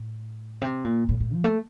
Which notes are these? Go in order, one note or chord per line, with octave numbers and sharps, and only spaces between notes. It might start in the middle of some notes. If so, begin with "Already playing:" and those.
Already playing: A2
C3
A#2
A2
A2
F3
A3